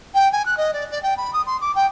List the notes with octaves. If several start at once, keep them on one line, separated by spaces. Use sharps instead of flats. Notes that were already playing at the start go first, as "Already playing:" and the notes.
G5
G#5
F#6
D#5
D5
D5
G5
B5
D#6
C6
D6
G5